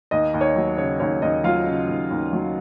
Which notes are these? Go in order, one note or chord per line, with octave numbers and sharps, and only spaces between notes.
D#2 D#5
D#2
C#5
D#5
F#3
C#3 C#5
D#2 C#5
D#2 D#5
F#3 F4 F5
C#3
D#2
D#2
F#3